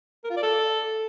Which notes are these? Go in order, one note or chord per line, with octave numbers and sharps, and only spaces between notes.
A#4
F4
D5
A4